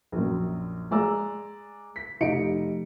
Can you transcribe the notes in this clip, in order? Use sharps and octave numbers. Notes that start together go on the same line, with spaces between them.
A#1 F#2
G#3 G#4 D5 A#5 E6
B6
F1 D#4 G4 D#5 C#7 D7